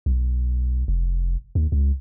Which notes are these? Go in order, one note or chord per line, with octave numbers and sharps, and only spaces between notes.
B1
F1
D#2
C#2